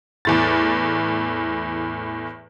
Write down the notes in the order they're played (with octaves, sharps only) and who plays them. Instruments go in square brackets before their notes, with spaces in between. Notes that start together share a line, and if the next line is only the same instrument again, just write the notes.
[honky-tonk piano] E2 A2 A6